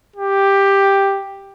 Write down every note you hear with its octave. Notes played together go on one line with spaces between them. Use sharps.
G4